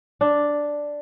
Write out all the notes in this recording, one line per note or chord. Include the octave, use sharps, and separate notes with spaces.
D4